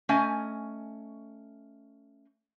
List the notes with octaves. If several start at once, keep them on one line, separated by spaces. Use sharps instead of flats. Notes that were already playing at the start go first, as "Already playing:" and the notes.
A3 C#4 D#5 G#5